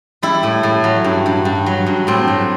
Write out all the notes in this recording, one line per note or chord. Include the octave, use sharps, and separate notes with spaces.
G3 E4
A2
A2
F#3
G2
G2
G2
F#3
G2
A2 C4
F#3